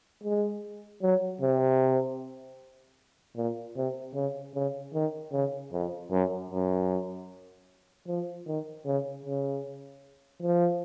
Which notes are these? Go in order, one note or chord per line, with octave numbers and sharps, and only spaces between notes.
G#3
F#3
C3
A#2
C3
C#3
C#3
D#3
C#3
F2
F#2
F#2
F3
D#3
C#3
C#3
F3